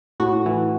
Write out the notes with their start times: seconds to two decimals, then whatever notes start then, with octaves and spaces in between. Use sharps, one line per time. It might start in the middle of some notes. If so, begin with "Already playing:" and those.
0.20 A2 F#4
0.46 E3